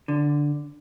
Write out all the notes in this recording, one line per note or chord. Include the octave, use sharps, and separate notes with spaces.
D3